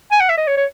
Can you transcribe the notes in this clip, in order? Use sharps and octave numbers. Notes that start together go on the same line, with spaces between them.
G#5
F#5
E5
D#5
C#5
C#5